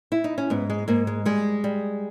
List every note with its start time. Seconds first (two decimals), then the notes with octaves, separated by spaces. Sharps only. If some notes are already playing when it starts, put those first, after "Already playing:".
0.12 E4
0.24 D#4
0.38 C#4
0.50 G#2 B3
0.70 G#3
0.88 G#2 A#3
1.07 G#3
1.25 G3 G#3
1.64 G3